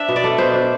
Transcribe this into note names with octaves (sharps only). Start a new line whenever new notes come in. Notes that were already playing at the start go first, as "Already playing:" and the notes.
Already playing: D4 E5
B2
D5
A3
B2 C5
D4